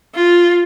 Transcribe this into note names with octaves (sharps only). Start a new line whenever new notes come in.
F4